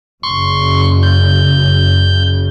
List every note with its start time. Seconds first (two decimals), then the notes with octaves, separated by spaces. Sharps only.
0.23 F#1 F#2 C#3 C6 C#6
1.03 G6